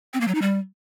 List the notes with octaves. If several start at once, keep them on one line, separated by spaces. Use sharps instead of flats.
C4
A#3
F#3
D#4
G3